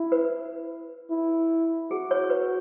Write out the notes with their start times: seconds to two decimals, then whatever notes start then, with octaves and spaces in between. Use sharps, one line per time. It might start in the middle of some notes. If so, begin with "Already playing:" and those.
Already playing: E4
0.12 B4
1.11 E4
1.91 F#4 G#4
2.11 C#5
2.30 B4